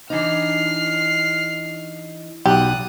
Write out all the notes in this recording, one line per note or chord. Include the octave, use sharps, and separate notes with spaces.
E3 D4 D#4 F6 C7
B1 G4 D5 D#6 F#6